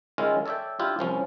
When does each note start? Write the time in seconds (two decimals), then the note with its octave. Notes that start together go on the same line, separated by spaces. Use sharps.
0.18 D#3 G#3 C#4 E4 F4
0.46 A4 C#5 D5 E5 G5
0.79 D4 E4 F4 G4
0.99 C2 F3 C#4